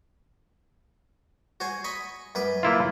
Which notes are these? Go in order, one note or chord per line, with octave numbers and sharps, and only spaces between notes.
F#4 C5 G#5
D#5 B5 C#6
F#2 B4 D6
A#3 E4 F4